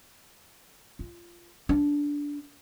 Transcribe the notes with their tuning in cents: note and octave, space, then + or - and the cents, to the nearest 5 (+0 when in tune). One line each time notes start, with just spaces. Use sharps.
F4 -15
D4 -15